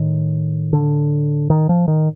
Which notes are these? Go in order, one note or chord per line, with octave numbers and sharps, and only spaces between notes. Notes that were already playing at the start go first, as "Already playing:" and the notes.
Already playing: A2 D#3
D3
D#3
F3
D#3